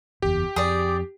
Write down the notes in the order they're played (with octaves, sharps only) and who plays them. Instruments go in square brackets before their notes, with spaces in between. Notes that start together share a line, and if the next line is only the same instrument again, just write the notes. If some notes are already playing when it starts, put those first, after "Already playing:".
[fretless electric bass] F#1 E2 [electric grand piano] G4
[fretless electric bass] F2 [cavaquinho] G#4 D5